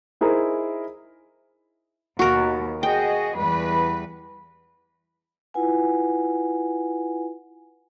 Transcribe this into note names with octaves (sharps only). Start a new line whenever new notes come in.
D#4 E4 G#4 A#4 C5
D#2 B2 F#4 A#4
F#4 G#4 D#5 G5
E2 G3 B4
E4 F4 B4 F#5 G#5